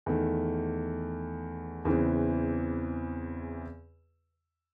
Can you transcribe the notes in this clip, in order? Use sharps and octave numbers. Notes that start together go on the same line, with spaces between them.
E2 D#3 A3
E2 C#3 E3 C4